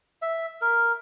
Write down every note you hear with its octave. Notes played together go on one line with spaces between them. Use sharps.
E5
A#4